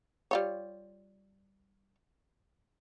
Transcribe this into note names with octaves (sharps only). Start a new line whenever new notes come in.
G3 F4 C#5